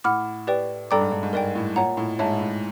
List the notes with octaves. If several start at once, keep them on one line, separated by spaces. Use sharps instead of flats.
A2 F#5 B5 D6 F6
G4 B4 D5 G5
G2 A4 D5 G5 A#5 D6
G#2
G2
G#2
G#2 A#4 D5 G5
A2
A#2 C#5 F#5 A#5
A2
G#2 C#5 E5 A5
A2